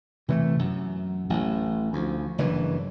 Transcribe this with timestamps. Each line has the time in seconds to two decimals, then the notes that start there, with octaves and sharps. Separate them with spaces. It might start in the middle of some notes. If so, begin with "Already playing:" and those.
0.28 C3 E3 G#3 A3
0.59 F#2
1.30 A1
1.93 D2 F3
2.38 F#1 G2 E3